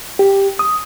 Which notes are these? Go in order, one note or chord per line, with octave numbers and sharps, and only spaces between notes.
G4
D#6